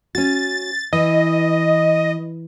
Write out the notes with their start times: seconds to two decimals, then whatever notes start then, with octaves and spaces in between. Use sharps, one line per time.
0.15 C#4 F#4 A6
0.93 E3 D#5